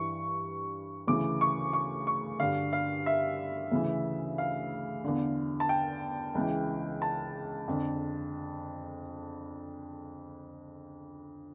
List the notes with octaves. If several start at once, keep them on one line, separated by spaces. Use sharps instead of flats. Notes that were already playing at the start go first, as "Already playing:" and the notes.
Already playing: G2 E3 C#6
D2 C#3 E3 D6
C#6
C#6
C#6
G2 D3 F5
F5
E5
D2 C#3 E3
F5
E2 D3
A5
G5
C#2 C#3 E3
A5
F2 D3